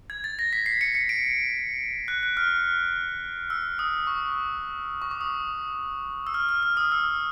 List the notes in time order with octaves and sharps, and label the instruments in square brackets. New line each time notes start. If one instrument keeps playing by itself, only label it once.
[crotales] G#6
A6
A#6
B6
C7
C#7
C#7
D7
F#6
F#6
F6
E6
D#6
C#6
C#6
D6
D#6
E6
F6
F6
F6
D#6
E6